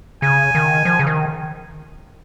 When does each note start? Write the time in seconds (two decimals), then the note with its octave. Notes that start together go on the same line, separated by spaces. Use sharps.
0.22 C#3 G#5
0.55 D#3
0.85 F3
0.99 C#3
1.07 D#3